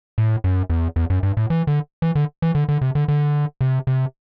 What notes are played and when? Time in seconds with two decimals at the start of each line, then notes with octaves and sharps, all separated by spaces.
0.18 A2
0.44 F#2
0.70 E2
0.96 E2
1.10 F#2
1.23 G2
1.37 A2
1.50 E3
1.67 D3
2.02 E3
2.15 D3
2.42 E3
2.55 D3
2.69 D3
2.81 C3
2.95 D3
3.08 D3
3.61 C3
3.87 C3